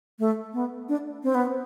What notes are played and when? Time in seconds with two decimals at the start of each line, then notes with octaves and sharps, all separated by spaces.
0.19 A3
0.53 B3
0.89 D4
1.23 C4
1.35 B3